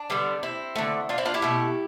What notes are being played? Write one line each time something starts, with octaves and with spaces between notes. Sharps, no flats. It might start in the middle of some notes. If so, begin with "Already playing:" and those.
Already playing: D4
D3 G3 B3
C4 E4
D3 A3
D4 F4
C4 E4
D4 F4
E4 G4
B2 A3